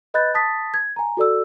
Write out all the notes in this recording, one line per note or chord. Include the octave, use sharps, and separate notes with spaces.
B4 D#5 B5 F#6 G6 A6
A5 D#6 A6 B6
G#6
G#5 A#5
F#4 A4 D5 E6